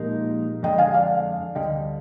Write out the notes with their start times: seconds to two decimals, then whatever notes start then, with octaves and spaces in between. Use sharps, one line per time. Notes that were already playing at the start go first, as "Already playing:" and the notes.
Already playing: A#2 F3 G#3 D#4 G4 A#4
0.63 F2 D3 G#3 D4 D#5 G5
0.78 F5 G#5
0.93 D5 F5
1.55 D2 D3 G3 D#5 G5